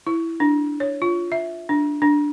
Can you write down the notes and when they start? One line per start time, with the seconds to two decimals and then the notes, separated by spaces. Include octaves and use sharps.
0.07 E4
0.40 D4
0.80 C#5
1.02 F4
1.32 E5
1.69 D4
2.02 D4